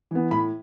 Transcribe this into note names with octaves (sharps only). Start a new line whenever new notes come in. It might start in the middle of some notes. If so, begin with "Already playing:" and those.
E3 B3
A2 B5